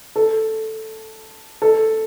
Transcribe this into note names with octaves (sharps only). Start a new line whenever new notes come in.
A4
A4